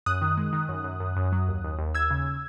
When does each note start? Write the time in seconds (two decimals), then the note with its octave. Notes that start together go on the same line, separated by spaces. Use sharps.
0.06 F#2 D#6 F#6
0.21 D#3
0.37 G#3
0.53 D#3
0.69 F#2
0.84 F#2
1.00 F#2
1.16 F#2
1.32 F#3
1.48 D#2
1.64 D#2
1.79 D#2
1.95 D#2 E6 G#6
2.10 C#3